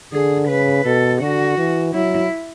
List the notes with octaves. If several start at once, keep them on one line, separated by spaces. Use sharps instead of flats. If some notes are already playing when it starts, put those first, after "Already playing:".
D3 G#4
C#3 B4
B2 A4
D3 F#4
E3
F#3 E4